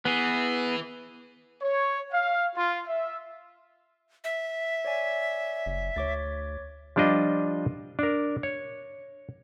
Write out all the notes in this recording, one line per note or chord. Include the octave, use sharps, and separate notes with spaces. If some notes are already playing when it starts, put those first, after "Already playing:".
E3 B3 G#4
C#5
F5
F4
E5
E5
C#5 D5 G#5
F#1
D2 C#5 D6 A6
F3 G3 D4 F4 D#5
D4 A#4
C#5